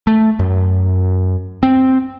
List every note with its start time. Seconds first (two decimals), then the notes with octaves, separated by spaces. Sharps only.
0.07 A3
0.39 F#2
1.63 C4